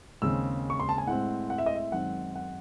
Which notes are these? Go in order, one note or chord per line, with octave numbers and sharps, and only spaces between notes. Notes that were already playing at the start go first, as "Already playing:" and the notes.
D#2 C#3 G#3 C4 E6
C#6
C6
A5
G#5
A2 G#3 C4 F#5
F#5
E5
D#5
E5
F#2 D#3 G#3 C4 F#5
F#5